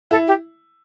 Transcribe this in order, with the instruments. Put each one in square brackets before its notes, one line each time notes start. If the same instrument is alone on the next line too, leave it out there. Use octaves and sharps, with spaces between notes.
[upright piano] E4 [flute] A4
[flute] G4